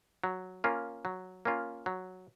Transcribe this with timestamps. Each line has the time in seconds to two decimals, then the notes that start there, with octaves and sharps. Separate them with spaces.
0.24 F#3
0.64 A#3 C#4 F4
1.05 F#3
1.45 A#3 C#4 F4
1.86 F#3